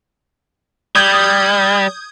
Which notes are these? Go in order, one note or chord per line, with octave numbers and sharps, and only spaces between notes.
G3 D#6 G6 G#6